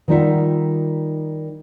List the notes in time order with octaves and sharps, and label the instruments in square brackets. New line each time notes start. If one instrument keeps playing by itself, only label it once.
[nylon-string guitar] D#3 G3 D#4 F4 E5 F#5